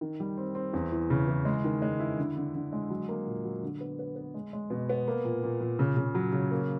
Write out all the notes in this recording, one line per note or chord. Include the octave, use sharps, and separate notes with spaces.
D#3
G3
C4
C4
E2
E3
C#3
E3
G#3
D#3
G#3
E4
D3
D3
D3
G#3
F#3
A#3
A#2
F#3
D3
B3
B3
B3
G#3
G#3
B2
B3
A#3
A#2
A#2
A#2
C#3
C#3
F#3
C#3
A#3